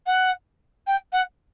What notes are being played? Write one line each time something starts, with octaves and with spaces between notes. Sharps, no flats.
F#5
G5
F#5